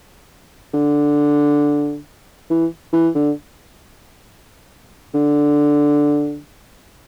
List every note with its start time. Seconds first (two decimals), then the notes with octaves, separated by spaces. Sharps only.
0.74 D3
2.50 E3
2.93 E3
3.15 D3
5.14 D3